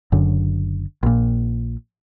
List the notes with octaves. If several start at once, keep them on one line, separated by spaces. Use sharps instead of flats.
F#1 F#2 D3
A#1 A#2